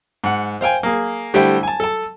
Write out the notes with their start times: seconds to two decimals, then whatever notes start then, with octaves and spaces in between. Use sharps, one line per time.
0.24 G#2 F#5
0.61 C5 F5 G5 G#5
0.83 A#3 G#4
1.34 D3 G3 A3 E4 C5 G5
1.63 G#5 A5
1.80 A4 A5